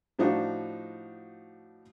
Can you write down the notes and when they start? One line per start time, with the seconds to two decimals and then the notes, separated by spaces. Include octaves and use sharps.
0.19 A2 F3 D4 D#4 F4 F#4